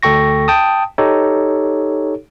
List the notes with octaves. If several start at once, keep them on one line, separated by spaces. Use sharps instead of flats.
D2 A4 G5 C#6 A#6
G5 A5 D#6
D#4 G4 A4 C#5